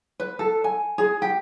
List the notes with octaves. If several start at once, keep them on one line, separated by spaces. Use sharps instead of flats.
B4
A4
G#5
G#4
G4